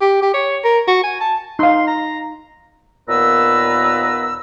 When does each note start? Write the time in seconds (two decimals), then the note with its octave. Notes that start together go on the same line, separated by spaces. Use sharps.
0.01 G4
0.22 G4
0.34 C#5
0.64 A#4
0.88 F#4
1.04 G#5
1.21 A5
1.59 D#4 F5 C6
1.87 A#5
3.09 D#2 A#2 B3 B4 A#5 E6